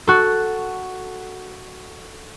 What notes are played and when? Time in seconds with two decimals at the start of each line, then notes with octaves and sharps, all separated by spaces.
0.07 F#4 A4